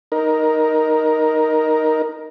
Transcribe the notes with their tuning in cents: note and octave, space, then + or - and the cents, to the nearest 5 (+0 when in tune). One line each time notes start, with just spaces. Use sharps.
D#4 +0 A#4 +10